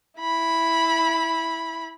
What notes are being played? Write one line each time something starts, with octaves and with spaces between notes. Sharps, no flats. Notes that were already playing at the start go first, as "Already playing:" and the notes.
E4 B5